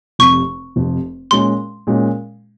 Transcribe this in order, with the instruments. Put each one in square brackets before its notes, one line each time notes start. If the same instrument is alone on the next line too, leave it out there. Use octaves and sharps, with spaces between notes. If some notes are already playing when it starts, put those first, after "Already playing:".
[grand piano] F1 F2 C3 [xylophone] C#6
[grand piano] F1 F2 C3
[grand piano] A#2 G#3 C#4 [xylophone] C6
[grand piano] A#2 G#3 C#4